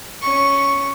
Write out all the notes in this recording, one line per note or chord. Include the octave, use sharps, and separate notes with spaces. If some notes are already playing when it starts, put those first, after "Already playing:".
C#4 C#6